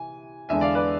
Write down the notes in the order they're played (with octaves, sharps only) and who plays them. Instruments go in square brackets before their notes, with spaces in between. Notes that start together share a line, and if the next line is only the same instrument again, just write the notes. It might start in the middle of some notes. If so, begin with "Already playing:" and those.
Already playing: [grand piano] C3 E3 G#5
E2 D3 G#3 D4 E5 G#5
D5 F5
B4 D5